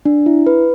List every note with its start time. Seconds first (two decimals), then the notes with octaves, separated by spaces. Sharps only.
0.05 D4
0.26 E4
0.47 B4